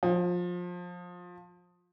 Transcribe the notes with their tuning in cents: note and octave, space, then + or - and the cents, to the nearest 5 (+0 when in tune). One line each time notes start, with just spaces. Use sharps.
F3 +25